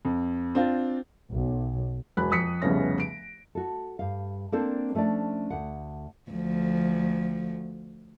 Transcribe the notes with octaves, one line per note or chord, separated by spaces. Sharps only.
F2
C4 D4 F4
B1
E1 B5 F#6
F2 D#6 B6 C#7
F1 C2 C#3 B3 C#4 A#6
D7
F#4 A4
G2 F5
A#3 C4 D4 A4 C5 D5
F3 A3 C#4 D4 D5
D2 F#5
D2 F3